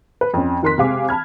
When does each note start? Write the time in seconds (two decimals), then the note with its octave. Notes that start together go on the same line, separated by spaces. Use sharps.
0.21 B4
0.34 F2 C#4
0.62 F2 D#3 A#4 C6 F#6 B6
0.78 C3 G#3 C4 F5 G#5 D6
1.09 A5 B5 F6 G#6